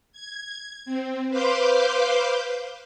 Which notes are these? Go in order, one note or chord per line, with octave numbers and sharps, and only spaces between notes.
G#6
C4
B4 C5 F5 C6 D6 G6